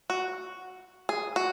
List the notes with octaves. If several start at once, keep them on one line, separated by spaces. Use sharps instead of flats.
F#4
G#4
F#4